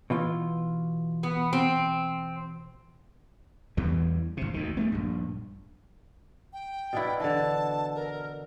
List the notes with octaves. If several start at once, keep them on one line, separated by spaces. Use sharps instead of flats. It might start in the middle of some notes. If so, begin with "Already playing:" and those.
B2 E3 F4
B3
C4
E2 E3 G3
G#1 C3
D2 D#3
G3 A3 B3
A#1 G2
G5
B2 D4 E4
D3 E3 A5
A#4